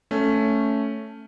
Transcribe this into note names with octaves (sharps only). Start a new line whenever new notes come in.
A3 C#4